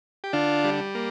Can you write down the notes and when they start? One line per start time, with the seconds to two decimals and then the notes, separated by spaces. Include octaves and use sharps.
0.24 G4
0.33 D3 D4 F4
0.64 G3
0.95 A#3